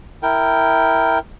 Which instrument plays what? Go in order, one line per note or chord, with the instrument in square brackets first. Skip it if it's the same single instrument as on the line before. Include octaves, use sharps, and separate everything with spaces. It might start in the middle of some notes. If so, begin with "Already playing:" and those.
[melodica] E4 A#4 G5